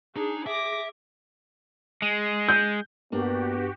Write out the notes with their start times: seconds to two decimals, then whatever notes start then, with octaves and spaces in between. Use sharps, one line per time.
0.16 D4 D#4 G#4
0.47 E5 D6 A#6
2.02 G#3
2.49 G6
3.12 G2 A#3 B3 D4 F#4 G4